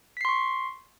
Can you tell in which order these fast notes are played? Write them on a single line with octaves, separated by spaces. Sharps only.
B6 C7 C6 C#6